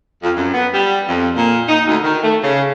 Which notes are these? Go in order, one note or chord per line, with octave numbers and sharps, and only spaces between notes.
F2
F#2
B3
G3
F2
A#2
D#4
D2
D#3
A3
C#3